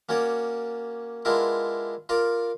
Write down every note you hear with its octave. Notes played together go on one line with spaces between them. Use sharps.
A#3 C#4 F#4 C#5 D5
G#3 B3 D4 E4 F4 A#4
F4 A#4 D5 F5